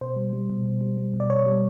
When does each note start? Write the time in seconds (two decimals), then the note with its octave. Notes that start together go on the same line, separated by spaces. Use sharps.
0.01 B2 C5
0.16 G3
0.33 G3
0.50 B2
0.66 B2
0.81 G3
0.97 G3
1.14 B2
1.20 D5
1.30 B2 C#5
1.46 G3